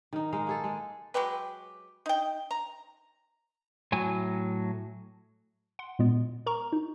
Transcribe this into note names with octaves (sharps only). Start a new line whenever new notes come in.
D#3 D#4
G#3 D#4 F5
A#3 G#4 A4
G#3
F#3 G#3 G4 B4
D#4 G5
A#5
A2 F#3 G#5
F#5 C6
A#2 G#3 B3
A#4 A#5 C#6
D#4